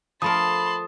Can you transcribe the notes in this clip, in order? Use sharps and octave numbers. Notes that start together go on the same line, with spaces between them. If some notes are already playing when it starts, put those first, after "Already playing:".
F3 A3 A#4 A5 B5 C6 D#6